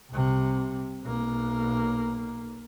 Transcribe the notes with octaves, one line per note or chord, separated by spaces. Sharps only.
C2 C3
B1 A#3